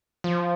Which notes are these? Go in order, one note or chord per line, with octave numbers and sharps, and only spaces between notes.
F3